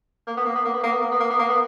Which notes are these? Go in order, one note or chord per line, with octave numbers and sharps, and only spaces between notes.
A#3
B3
A#3
B3
A#3
B3
A#3
B3
A#3
B3
A#3
B3
A#3
B3